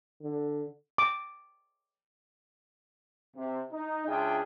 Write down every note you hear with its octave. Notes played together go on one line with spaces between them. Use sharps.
D3
D6
C3
D#4
C#2 D4 F4 G#4 E5 G5